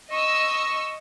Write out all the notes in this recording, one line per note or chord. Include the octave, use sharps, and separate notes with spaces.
D#5 C#6 E6